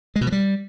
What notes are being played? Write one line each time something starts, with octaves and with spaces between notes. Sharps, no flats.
G#3
B2
F3
G3